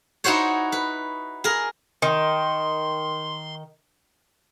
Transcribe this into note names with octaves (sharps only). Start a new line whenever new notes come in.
D#4 E4 F#4 C5 C#5
B4
G#4 A#4
D#3 C6